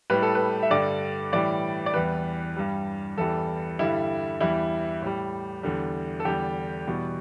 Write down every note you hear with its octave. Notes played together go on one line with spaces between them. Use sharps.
A2 G3 B4
A4
B4
E5
G2 D3 G3 D5
A2 E3 G3 D5
D5
E2 E3 G3 B4
G2 G3
E2 E3 G3 A4
G2 D3 G3 E4
E2 E3 G3 E4
A2 G3
E2 D3 G3
A4
E2 D3 G3 G4
E2 B2 G3